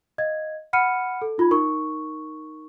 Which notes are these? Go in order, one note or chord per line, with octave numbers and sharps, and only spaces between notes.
D#5 F5 G#6
F#5 B5 F6 C#7 D#7
A4
D#4 F4 B5 G#6
D#4 A#4 C#6